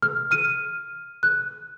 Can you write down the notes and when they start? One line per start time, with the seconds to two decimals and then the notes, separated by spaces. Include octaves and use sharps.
0.02 F6
0.31 F6 D#7
1.23 F#6